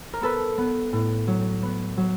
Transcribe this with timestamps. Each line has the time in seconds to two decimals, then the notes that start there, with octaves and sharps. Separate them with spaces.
0.14 A#4
0.21 B3 A4 B4
0.58 B3
0.93 A2
1.27 F#3
1.63 B3
1.97 F#3